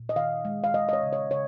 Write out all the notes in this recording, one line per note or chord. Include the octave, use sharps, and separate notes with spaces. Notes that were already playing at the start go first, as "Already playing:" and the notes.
Already playing: A#2
D#5
D#3 F5
G#3
F5
G#3 D#5
D#5
C#5
C#3
C#5
C#3 C#5